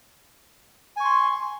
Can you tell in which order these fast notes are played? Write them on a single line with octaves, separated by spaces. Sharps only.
G#5 C#6 C6